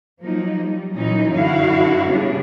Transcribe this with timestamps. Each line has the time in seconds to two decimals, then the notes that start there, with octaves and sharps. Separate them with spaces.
0.21 F3 F#3 A#3 D#4
0.61 G3
0.94 A#2 E3 F#3 C#4 D#4
1.31 F#2 D3 E4 F#4 F5
2.07 C#3 G3 B3 D4